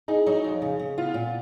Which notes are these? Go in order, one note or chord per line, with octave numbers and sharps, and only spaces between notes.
D#4 G#4
F#3 D#4
F2
C#3
C#3
B3 F4
A#2